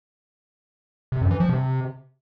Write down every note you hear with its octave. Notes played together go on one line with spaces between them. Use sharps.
C3
F#2
E3
F3
C3